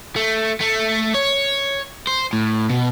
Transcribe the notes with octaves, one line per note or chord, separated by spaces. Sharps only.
A3
A3
C#5
C5
A2
B2